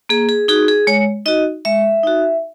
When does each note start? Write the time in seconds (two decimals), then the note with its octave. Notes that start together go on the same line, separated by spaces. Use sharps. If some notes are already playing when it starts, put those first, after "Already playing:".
0.09 A#3 G#4
0.29 G#4
0.48 D#4 F#4 G#4
0.68 G#4
0.87 G#3 C#5
1.26 D#4 F#4 D#5
1.65 G#3 E5
2.03 D#4 F#4